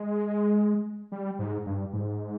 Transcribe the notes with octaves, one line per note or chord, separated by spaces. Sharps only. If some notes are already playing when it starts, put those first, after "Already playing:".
Already playing: G#3
G3
G#2
G2
G#2